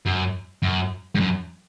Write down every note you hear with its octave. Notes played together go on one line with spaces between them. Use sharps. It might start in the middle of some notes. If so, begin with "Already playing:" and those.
F#2
F#2
G2
F#2